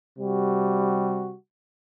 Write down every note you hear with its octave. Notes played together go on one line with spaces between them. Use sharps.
C3 G3 F#4